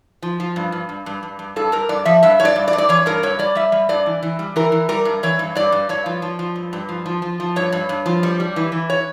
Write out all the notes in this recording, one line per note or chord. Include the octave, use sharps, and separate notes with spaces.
F3
F3
G2
G2
G2
G2
G2
G2
G2 A4
G2 A#4
G2 D5
F3 E5
G2 E5
G2 C#5
D5
G2
D5
G2
D5
E3 C#5
G2 A#4
G2 C#5
G3 D5
G3 E5
G3
G2 D5
E3
E3
G3
E3 A#4
E3
G3 A#4
G2
E3 C#5
G2
G2 D5
G2
G2 C#5
F3
F3
F3
G2
G2
F3
F3
F3
F3
G2 C#5
G2
G2
F3
G3
G3
E3
E3
C#5